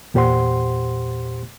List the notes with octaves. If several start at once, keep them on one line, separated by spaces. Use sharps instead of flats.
E2 A#2 G4 C5 F#5 C6